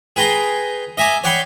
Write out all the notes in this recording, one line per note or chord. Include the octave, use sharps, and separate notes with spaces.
G#4 B4 G5 A#5 C6
D#5 E5 G#5 A#5 D6
C#5 D5 F#5 G5 B5 C6